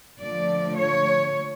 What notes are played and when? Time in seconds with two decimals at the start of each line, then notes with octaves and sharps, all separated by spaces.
0.21 D3 F3 A3 D5
0.76 C#5